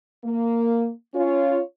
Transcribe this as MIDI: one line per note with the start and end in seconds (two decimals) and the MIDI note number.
0.25 0.91 58
1.14 1.59 61
1.14 1.59 65
1.14 1.59 73